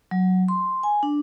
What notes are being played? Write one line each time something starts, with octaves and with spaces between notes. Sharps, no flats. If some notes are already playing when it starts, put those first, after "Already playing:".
F#3
C6
G#5
D4